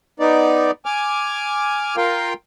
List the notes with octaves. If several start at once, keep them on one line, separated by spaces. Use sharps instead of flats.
B3 D#4 D5
G#5 D6 F6
F4 A#4 F5 G5